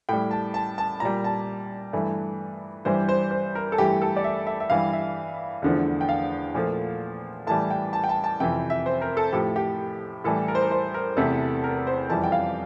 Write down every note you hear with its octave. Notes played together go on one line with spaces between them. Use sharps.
A2 G3 G5
A5
A5
A5
A#2 G3 A#5
A5
G2 E3 A3
G2 E3 G3 C5
C5
C5
A#4
A4
G2 E3 A3 G4
A4
D5
E5
E5
E5
G2 E3 G3 F5
E5
E2 D3 F3 A3
G5
F5
A#2 F3 A3
A2 E3 G3 A5
G5
A5
G5
A5
A5
F2 C3 E3 G5
E5
C5
A#4
A4
A2 F3 A3 G4
G4
A2 E3 G3 A4
A#4
C5
A#4
C5
A#4
E2 C3 E3 A3 A4
A#4
C5
F2 E3 G3 A5
G5
F5